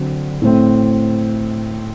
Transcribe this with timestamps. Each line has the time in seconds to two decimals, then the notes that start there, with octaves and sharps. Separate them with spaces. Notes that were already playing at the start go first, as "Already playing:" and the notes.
Already playing: D3 F#3 C4
0.42 A2 A3 C4